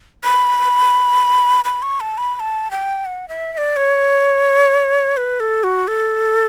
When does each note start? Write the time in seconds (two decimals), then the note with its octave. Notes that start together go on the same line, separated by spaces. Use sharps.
0.24 B5
1.65 B5
1.82 C#6
2.00 A5
2.18 B5
2.36 B5
2.40 A5
2.71 G5
3.06 F#5
3.29 E5
3.53 E5
3.58 D5
3.76 C#5
5.17 B4
5.40 A4
5.64 F#4
5.88 A4